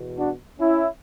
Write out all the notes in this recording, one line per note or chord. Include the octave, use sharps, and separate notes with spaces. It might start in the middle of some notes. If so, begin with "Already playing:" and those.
Already playing: E2 B2
D4 F#4
C#4 E4